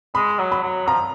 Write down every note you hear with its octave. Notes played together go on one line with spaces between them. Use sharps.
G#3 B5
F#3
B5
F#3
F3 A#5